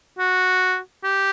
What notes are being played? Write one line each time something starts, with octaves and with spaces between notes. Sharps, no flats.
F#4
G4